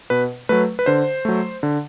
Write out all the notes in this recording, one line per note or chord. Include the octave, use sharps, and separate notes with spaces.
B2 B4
F#3 A3 B4
B4
D3 C5
F#3 A3
D3